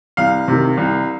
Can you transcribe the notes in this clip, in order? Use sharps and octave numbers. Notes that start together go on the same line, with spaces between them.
C2 F5
C3 D#3
C2